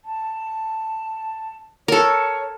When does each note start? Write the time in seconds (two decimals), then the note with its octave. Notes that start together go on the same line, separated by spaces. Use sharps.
0.05 A5
1.88 A4 A#4 C#5